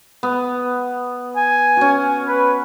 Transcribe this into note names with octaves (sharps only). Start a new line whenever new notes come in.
B3
G#5
C#4 F#4
B4